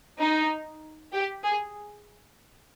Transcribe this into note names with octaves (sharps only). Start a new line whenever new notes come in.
D#4
G4
G#4